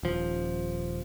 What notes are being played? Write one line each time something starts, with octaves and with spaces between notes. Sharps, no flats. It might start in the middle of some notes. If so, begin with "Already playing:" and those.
D#1 F3